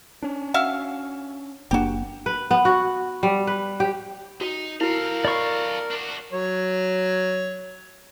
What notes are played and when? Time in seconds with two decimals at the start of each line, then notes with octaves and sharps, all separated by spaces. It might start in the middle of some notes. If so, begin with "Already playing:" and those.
0.22 C#4 D4
0.54 F#4 E5 F5
1.71 F#1 A#3 D4 F#4 G4
2.26 B4
2.51 B3
2.65 F#4
3.23 G3
3.47 B4
3.80 G4
4.41 D#4 F#4
4.81 E4 F#4 A4 A#4 F5
5.25 D5 B5 C#6
5.91 D4 F#4
6.33 F#3 C#5